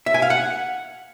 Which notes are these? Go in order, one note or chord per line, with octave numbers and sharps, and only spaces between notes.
E5
G#5
F5
F#5